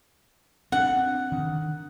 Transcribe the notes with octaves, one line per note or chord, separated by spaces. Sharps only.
C4 D4 F#5
D#3